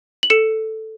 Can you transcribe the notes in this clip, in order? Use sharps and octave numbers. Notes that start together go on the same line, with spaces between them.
F#7
A4 C#7 E7